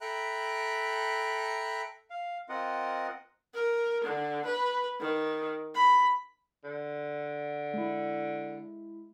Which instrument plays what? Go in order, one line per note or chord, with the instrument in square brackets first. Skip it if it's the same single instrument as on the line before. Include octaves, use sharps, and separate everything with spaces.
[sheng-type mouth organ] A4 E5 G5 A#5 B5 F#6
[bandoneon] F5
C4 F4 A#4 D#5 F#5
[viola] A#4
D3
B4
D#3
B5
[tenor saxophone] D3
[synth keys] G#3 E4